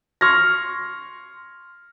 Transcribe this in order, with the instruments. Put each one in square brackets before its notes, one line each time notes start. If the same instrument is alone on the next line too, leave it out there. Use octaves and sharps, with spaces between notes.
[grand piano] C6 C#6 F6 G#6 A#6